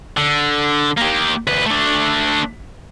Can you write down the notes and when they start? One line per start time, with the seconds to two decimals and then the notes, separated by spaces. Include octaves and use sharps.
0.17 D3
0.98 A#3 G4
1.47 D2 B4
1.66 A3 D4